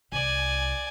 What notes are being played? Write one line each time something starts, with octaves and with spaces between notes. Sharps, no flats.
C2 D5 G#5